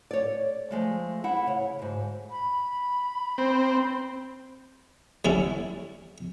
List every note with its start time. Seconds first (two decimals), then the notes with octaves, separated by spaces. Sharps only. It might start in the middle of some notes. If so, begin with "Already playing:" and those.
0.11 C#5 D5
0.71 F3 G#3 A3
1.24 E4 F#5
1.46 C#3 C#5
1.79 D2 G#2
2.31 B5
3.38 C4
5.25 G3 C#4 E4